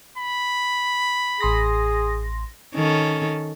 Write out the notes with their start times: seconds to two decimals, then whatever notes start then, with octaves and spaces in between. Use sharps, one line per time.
0.18 B5
1.40 A1 G#4 C6 A#6
2.75 D#3 C#4 A4